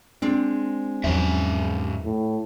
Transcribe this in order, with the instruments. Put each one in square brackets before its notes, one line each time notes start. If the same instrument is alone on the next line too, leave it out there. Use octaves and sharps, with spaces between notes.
[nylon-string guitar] G#3 C4 D4
[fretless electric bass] E2 F3 F#3 [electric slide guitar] G#2 C#4 E5
[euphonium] A2